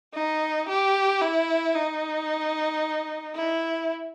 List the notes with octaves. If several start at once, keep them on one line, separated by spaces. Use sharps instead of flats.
D#4
G4
E4
D#4
E4